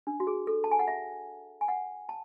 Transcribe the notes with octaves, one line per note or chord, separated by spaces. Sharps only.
D4
F#4
G#4
A4
A5
G#5
F#5
E5
G#5
F#5
A5